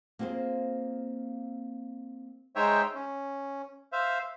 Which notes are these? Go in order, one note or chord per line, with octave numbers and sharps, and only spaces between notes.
A#3 C4 F4 G#4 C5
G#3 D#4 C5 C#5 E5 G5
C#4
C5 E5 F5